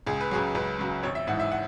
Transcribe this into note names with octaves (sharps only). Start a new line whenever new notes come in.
C#2 G#4
B4
C#3 F#3 G#4
C#2 B4
C#3 F#3
G#1 C#5
E5
G#2 E3 F#5
E5
F#5